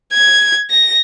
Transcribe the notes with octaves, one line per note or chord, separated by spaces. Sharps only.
G#6
A#6